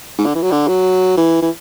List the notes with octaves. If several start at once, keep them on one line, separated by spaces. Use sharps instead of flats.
G#2
D3
E3
F#3
D3
F#3
E3
E3